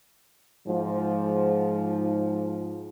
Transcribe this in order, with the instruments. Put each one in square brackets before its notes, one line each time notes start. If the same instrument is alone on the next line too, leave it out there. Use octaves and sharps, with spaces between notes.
[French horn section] G#2 F3